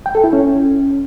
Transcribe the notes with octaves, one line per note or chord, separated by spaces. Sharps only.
G5
A4
E4
C#4